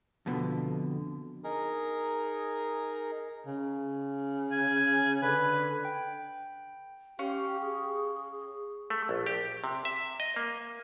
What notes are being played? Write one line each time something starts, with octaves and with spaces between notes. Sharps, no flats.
F2 B2 D3
D#4 G#4 A#4
C#3
G#5
D3 B4
G5
C#4 G4 F5
G#4
A3
A#1
G4
C3
E5
D#5
A#3